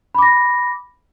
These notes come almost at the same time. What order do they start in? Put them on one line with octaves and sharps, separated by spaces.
B5 D6 A#6